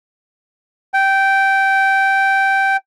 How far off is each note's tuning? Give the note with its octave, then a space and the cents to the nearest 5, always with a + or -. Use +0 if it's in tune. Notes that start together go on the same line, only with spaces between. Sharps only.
G5 -10